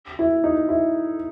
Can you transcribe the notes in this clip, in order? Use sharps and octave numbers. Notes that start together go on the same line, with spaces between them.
E4
D#4
E4